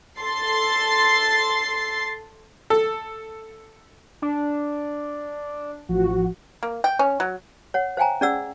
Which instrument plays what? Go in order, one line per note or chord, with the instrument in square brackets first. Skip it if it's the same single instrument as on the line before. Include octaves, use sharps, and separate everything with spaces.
[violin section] A4 C6 A6 C7
[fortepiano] A4
[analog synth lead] D4
[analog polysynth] A1 F3 F#4
[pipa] A#3
G5
C#4
F#3
[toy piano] C#5 F#5
C5 F5 G5 G#5 A#5
C#4 G#4 D5 F#5 E6